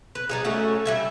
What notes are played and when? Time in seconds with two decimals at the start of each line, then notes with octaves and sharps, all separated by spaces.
0.15 B4
0.29 G3 D#4 G#4
0.45 A3 C#4 F#4
0.85 G3 E5 G#5